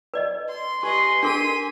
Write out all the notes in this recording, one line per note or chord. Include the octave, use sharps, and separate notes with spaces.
B4 D5 D#5
C6
G4 B4 D#5 G#5 C6
D4 G#4 A#4 B6 D#7